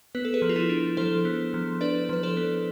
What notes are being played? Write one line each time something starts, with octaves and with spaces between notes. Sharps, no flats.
B3 B4
A4
G#4 B4
F3
F4
E4 G#4
D4
F3 A4 C5
B3
F3
D4 B4 D5
F3 B4
A4 C5
B3